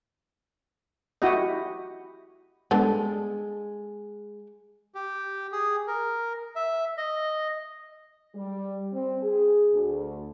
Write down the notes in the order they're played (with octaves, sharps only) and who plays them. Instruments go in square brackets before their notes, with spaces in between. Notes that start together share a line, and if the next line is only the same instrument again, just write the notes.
[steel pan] E4 F#4 G4 D#5
[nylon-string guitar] G#3 [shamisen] B3 D4 A4
[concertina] G4
G#4
A#4
E5
D#5
[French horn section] G3
C4
G#4
D2